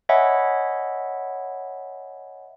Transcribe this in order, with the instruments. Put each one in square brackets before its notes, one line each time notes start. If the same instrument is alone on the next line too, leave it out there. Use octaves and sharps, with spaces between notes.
[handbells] C#5 D#5 E5 F#5 G#5 B5